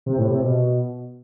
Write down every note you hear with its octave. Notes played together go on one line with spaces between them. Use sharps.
C3
A2
C3
B2